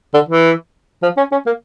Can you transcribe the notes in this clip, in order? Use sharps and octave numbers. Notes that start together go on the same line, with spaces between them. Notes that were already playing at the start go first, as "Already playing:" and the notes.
D3
E3
F3
C#4
C#4
A#3